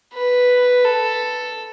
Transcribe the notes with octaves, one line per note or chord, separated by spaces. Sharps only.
B4
A4